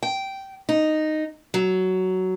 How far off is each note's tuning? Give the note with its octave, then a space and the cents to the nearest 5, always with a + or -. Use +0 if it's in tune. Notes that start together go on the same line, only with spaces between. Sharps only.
G5 -10
D#4 -5
F#3 +10